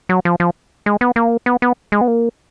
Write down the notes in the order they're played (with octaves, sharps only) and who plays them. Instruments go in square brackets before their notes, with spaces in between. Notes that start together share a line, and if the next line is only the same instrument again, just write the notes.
[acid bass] F#3
F3
F3
G#3
B3
A#3
B3
B3
G#3
B3
A#3